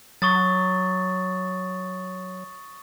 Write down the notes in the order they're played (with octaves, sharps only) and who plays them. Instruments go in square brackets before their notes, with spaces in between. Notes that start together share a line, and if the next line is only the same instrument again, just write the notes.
[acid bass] F#3 [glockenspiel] C#6 D#6 A6